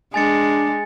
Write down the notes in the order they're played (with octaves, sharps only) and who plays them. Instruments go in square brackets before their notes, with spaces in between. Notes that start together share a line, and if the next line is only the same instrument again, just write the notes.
[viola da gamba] G#3 [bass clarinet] D4 [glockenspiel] G#5 A6 C#7